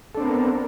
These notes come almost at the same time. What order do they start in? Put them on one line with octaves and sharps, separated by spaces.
A4 D4 C4 B3 A#4